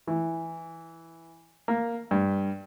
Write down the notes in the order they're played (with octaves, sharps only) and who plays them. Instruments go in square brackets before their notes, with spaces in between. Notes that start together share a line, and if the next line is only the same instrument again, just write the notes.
[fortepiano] E3
A#3
G2